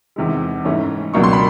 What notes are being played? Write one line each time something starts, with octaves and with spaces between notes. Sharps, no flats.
E2 C3 D#3 G#3
G#2 E3 A3 C#4
C#2 B2 F#3 A#3 D4 C#6
C6
B5